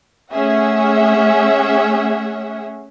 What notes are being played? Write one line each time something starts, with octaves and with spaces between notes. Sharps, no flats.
A3 C#4 G#4 E5 F#5